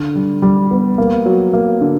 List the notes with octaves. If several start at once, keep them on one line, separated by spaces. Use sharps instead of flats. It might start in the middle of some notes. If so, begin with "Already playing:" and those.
Already playing: D3
G3
G3
B3
A#3
F#3
A#3
D3